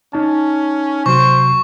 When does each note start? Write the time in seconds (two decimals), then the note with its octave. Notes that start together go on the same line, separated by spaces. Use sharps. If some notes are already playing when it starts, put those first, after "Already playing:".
0.13 C#4 D#4 A5
1.06 C3 F#3 F#4 C5 C#6